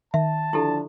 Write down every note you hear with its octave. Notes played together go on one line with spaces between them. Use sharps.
D#3 E5 A5
D3 F3 D4 E4 G4 A4